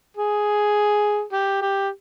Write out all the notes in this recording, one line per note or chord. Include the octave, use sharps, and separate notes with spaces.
G#4
G4
G4